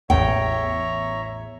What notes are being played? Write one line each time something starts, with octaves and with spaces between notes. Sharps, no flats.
A1 E2 C#5 E5 G5 A#5